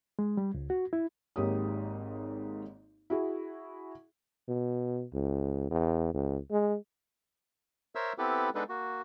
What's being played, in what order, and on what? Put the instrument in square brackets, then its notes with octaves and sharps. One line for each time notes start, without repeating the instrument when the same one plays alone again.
[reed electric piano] G#3
G3
C#2
F#4
E4
[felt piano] G#1 G#2 A#3 G4 C#5 D#6
E4 F#4 G#4
[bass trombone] B2
C#2
E2
C#2
G#3
[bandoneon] A#4 C5 C#5 E5 E6
B3 C4 E4 G4 A4 B4
G#3 B3 D4 D#4 A4 B4
A#3 F#4